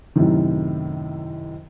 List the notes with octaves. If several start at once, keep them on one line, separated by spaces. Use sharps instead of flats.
F#2 A2 C3 D#3